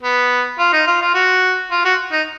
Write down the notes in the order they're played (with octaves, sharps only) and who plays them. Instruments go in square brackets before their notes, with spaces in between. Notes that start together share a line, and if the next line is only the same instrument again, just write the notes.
[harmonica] B3
F4
D#4
F4
F4
F#4
F4
F#4
D#4